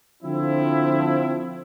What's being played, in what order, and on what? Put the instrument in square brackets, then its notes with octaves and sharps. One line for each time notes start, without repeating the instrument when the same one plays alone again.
[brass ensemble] D3 F3 C4 E4